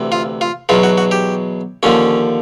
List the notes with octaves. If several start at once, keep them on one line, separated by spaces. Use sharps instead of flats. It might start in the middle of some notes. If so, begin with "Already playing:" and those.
Already playing: D2 C3 E3
F4
F4
E2 B2 F#3 F4
F#4
F#4
G4
D#2 D3 F3 C#4